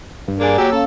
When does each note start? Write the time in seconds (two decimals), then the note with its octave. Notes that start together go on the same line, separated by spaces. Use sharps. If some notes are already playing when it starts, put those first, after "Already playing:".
0.28 G2
0.40 A#3 D4 G#4 G#5
0.58 F#3 A#3 G4 C#5 E6
0.72 C#4 A4 F5